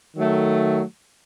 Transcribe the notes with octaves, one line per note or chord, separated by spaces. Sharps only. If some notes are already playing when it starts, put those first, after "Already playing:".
D#3 F#3 A3